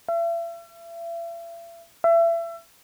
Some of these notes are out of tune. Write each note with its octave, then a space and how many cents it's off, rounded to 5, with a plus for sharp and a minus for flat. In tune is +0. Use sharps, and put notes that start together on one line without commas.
E5 +40
E5 +30